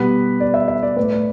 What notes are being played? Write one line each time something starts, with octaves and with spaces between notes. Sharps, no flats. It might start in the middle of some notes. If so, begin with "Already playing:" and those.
Already playing: B2 G3 B3 B4
D5
E5
E5
D5
A2 A3 B4
D5